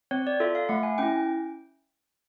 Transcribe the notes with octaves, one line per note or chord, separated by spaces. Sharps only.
C4 C#5
D5
F4 A4 E5
F5
A3 F#5
G#5
C#4 E4 G5